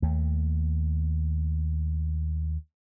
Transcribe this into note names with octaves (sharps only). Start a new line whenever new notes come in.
D#2 A3